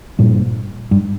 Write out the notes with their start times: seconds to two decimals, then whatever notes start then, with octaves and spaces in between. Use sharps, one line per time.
0.19 G2 A#2
0.91 G2